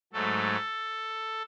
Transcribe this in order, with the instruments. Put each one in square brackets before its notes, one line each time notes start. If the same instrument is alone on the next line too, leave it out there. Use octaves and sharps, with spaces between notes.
[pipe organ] G#2 F#3 A3 A4